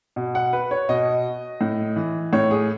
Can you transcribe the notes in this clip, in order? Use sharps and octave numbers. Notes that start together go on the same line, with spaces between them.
B2
F#5
B4
C#5
B2 D#5
A2
E3
A2 C#5
G#4